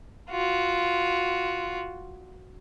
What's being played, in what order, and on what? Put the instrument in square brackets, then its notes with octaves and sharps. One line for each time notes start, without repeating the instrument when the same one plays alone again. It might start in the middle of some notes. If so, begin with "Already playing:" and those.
[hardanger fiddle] F4 F#4